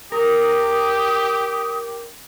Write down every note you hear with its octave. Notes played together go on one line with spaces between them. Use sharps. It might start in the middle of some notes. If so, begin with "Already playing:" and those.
G4 A#4 D#6